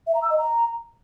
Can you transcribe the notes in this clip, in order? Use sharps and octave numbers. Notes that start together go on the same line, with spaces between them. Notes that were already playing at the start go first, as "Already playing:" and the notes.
E5
A#5
E6
D#5
A#5